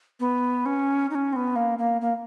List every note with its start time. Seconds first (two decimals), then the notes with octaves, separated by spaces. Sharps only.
0.20 B3
0.66 C#4
1.10 D#4
1.15 C#4
1.33 C4
1.36 B3
1.56 A#3
1.78 A#3
2.01 A#3